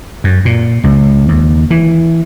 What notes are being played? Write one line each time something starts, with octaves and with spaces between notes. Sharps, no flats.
F#2
A#2
C#2
D#2
E3